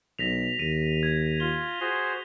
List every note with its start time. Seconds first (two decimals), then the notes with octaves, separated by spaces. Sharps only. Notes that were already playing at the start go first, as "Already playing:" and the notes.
0.19 B1 A#6 B6 F7
0.59 D#2 D#7
1.03 G#6
1.40 F4 G7
1.80 F#4 G#4 C5